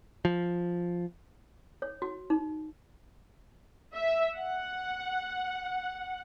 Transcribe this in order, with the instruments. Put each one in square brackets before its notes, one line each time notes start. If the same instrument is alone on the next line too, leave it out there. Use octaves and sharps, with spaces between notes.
[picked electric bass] F3
[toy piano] C#5
F#4
D#4
[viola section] E5
F#5